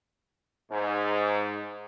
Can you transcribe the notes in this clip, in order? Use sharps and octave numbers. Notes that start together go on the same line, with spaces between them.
G#2